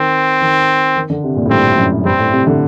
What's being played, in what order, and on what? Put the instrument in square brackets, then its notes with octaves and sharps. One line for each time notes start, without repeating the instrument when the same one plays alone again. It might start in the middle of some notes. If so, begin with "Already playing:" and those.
Already playing: [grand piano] D#3 [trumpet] C4
[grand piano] D#3
D#3
D3
C3
A#2
A2
[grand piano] G2 [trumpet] C4
[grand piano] F#2
[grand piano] G2 [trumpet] C4
[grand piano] A2
C3
D3